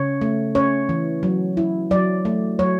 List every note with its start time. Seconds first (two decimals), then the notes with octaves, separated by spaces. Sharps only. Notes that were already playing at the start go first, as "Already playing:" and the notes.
Already playing: C#3 C#5
0.21 A3
0.55 C#4 C#5
0.89 E3
1.23 F#3
1.57 E4
1.91 F#3 D5
2.25 A3
2.59 F#3 C#5